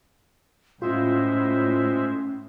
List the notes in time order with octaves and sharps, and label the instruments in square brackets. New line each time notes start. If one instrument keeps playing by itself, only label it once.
[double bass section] A2 [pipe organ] G#3 C5 E5 [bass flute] C#4 [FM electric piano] F4